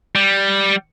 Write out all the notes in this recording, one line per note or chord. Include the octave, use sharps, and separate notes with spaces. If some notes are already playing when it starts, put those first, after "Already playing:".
G3